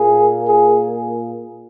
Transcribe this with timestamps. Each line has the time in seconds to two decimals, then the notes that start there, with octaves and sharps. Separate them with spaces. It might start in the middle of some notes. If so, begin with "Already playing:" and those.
Already playing: A#2 A#3 G#4
0.48 G#4